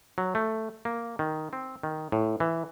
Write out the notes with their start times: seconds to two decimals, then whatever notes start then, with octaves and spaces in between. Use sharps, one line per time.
0.18 F#3
0.35 A3
0.85 A#3
1.19 D#3
1.53 C4
1.83 D#3
2.12 A2
2.40 E3